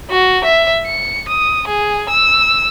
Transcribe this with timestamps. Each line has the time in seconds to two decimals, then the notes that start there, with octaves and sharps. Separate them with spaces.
0.10 F#4
0.44 E5
0.86 C#7
1.28 D#6
1.67 G#4
2.09 E6